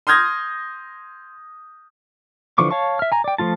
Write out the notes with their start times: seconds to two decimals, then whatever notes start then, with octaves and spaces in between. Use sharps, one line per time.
0.07 C6 D#6 F6 G6 G#6 A#6
2.58 D3 E3 F3 C#6 D6
2.71 C#5 F5 A5 C#6
2.99 E5 F6
3.12 G#5 A#5
3.24 D5 G5
3.38 F3 A3 F4 A5